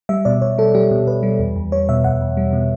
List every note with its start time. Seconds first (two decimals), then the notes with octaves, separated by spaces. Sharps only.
0.09 G3 E5
0.25 B2 D5
0.42 B2 C#5
0.58 G3 A4
0.74 G3 G4
0.91 B2
1.07 B2 B4
1.23 G3
1.39 E2
1.56 E2
1.72 G3 C#5
1.89 B2 E5
2.04 E2 F#5
2.21 E2
2.37 G3
2.53 B2